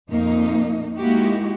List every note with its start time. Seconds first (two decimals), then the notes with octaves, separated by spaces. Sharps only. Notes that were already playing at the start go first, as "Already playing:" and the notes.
0.10 F2 A#2 A#3 D#4
0.97 G#3 A#3 D#4 E4 F#4 G4